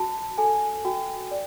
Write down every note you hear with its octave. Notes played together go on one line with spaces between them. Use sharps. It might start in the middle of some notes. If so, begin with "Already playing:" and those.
Already playing: F#4 A5
A4 G#5
F#4 G5
D5